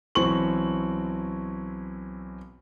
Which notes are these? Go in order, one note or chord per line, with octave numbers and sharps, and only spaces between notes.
B1 E3 C4 C#6 F#7